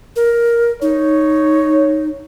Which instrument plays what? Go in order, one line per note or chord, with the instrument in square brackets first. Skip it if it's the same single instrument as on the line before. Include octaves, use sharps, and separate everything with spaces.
[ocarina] A#4
[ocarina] D#4 [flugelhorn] C#5